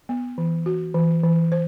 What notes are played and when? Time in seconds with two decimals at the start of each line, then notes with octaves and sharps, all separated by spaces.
0.09 B3
0.38 E3
0.66 F#4
0.94 E3
1.23 E3
1.52 C5